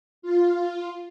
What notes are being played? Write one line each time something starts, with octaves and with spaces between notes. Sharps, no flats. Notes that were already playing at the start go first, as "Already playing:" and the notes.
F4